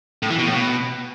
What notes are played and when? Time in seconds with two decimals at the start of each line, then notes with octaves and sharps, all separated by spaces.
0.22 A2
0.30 E3
0.38 B2
0.46 A2
0.54 B2